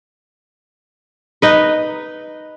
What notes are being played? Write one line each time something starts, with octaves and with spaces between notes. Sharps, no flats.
D#4 B4